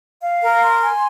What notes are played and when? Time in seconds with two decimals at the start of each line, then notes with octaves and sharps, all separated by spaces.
0.22 F5
0.42 A#4
0.62 C6
0.82 G#5